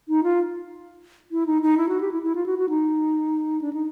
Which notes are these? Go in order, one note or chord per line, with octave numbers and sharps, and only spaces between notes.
D#4
F4
E4
D#4
D#4
E4
F#4
G4
E4
E4
F4
F#4
F#4
D#4
D4
D#4